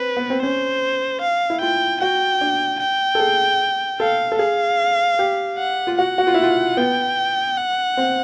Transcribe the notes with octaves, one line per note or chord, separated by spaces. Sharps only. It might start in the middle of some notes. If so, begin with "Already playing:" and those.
Already playing: C4 B4
B3
C4
C#4 C5
F5
E4
F4 G5
F#4 G5
D4
G5
A4
G#4
A4 F5
A4
G#4 F5
G4
F#5
F4
F#4 F#5
F#4
F4
E4
F4
B3 G5
F#5
C4